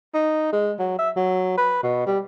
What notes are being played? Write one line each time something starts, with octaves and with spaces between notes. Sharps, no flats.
D#4
G#3
F#3
E5
F#3
B4
B2
G3